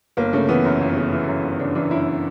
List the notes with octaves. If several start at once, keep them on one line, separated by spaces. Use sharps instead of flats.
G1 A#3
C#3 A3
E3 B3
F#2
G1
C#3
E3
F#2
G1
C#3 D4
E3 D4
F#2 E4